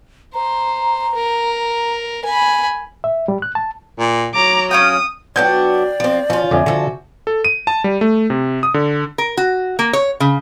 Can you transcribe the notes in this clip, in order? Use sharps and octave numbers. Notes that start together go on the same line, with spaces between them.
C5 A#5
A#4
G#5 B5
E5
G3
F#6
A5
A#2
F#3 A#5 D6
C#4 F5 G5 D#6
F#3 B3 D4 D5 G5 G6
F3 C4
F3 C#4 F4
F2 D3 E5 G#5 D6
D3 F3 F#4 A4
A4
D#7
A5
G3
A3
C3
D#6
D3
A#4
F#4
A#3
C#5
C#3